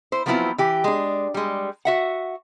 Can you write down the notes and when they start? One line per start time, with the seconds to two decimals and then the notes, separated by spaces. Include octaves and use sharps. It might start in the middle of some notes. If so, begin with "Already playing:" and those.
0.12 E4 C5
0.26 F3 F#3 B3 C4 E4 F4
0.58 E3 G4
0.84 G#3 D4
1.34 G3 G#3
1.85 F#4 E5 F#5